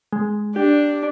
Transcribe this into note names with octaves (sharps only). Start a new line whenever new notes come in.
G#3
D4 G4